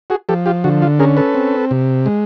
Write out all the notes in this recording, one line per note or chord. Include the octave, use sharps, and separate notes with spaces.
F#4 G#4
F3 G4 A4
F4 G4
D3 F#4
F4
C#4 G#4 A#4
A4 B4
C4
C3
G#3